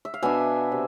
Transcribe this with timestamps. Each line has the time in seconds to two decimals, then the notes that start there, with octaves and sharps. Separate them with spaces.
0.05 E5
0.14 F5
0.23 B2 B3 D4 E5 G#5
0.72 C3